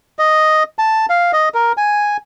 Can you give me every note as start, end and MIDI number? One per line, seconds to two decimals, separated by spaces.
0.19 0.63 75
0.79 1.06 81
1.10 1.32 77
1.33 1.49 75
1.54 1.73 70
1.77 2.17 80